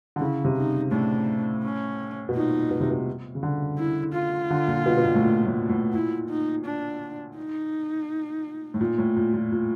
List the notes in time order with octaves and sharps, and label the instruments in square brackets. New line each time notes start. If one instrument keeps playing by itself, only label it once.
[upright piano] D3
[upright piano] C#3 [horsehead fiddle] E4
[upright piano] C3
[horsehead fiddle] D#4
[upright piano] A2 [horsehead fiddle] D4
[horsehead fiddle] C#4
[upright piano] B2
[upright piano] A#2 [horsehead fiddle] D#4
[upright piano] B2
C3
B2
C#3
D3
[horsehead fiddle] E4
F4
[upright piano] D3
A#2
B2
B2
A#2
A2
A#2
A2
A2
[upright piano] A#2 [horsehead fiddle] E4
[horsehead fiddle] D#4
D4
D#4
[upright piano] A2
A#2
A2
A#2
A#2
A#2